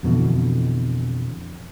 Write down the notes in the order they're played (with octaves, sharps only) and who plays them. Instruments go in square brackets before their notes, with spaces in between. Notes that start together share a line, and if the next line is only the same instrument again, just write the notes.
[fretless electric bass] F2 B2 D3 E3